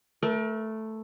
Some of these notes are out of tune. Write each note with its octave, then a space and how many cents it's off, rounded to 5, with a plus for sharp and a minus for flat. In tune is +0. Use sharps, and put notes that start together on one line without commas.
A3 +0 A#4 +35